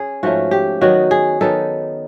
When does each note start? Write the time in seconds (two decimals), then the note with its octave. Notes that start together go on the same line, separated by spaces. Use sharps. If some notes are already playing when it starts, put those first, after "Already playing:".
Already playing: C#4 G#4
0.23 G#2 F3 A3 C#4 F#4
0.51 G4
0.81 D#3 F#3 B3 D#4 F#4
1.11 G#4
1.41 D#3 F#3 B3 D#4 A4